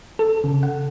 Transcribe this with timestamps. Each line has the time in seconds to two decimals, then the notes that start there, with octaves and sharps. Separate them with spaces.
0.19 A4
0.44 C#3
0.63 F#5